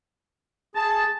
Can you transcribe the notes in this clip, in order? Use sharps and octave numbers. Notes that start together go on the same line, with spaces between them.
G#4 A5